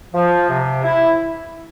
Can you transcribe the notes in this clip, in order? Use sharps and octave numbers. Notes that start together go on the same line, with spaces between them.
F3
C3
E4